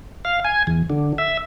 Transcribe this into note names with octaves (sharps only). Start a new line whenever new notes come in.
F5
G#5
E2
D3
E5